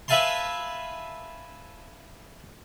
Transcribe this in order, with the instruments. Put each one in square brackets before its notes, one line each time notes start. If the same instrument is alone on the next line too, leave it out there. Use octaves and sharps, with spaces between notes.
[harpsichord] B4 E5 F5 G#5 A5 C6